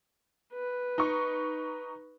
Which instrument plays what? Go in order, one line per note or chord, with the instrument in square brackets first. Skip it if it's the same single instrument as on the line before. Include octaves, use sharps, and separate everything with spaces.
[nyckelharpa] B4
[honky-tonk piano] D#4 C#6